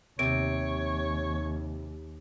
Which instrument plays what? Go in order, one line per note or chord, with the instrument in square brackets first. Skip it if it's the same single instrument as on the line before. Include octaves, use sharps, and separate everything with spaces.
[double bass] D#2 [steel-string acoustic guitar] C3 [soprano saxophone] C#5 [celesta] D7